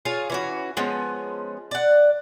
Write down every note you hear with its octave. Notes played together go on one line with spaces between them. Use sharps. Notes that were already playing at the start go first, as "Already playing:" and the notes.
F4 G#4 C#5 F5
E3 C#4 F#4
F3 G#3 B3 C#4
D5 F#5